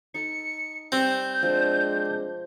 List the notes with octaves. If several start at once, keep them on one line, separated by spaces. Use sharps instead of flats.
D#4 A4 C#7
G3 C4 G6
F3 G#3 D4